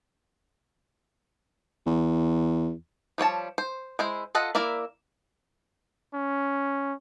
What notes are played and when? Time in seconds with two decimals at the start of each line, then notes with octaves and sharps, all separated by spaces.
1.86 E2
3.18 F3 G3 C#5 A5
3.58 C5
3.99 G#3 E4 C5
4.35 F4 A4 D#5 F#5
4.55 A#3 E4 A#4 D5 E5
6.15 C#4